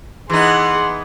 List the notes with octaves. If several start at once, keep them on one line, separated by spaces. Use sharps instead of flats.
E3 B3 D#4 G#4 F#5 C6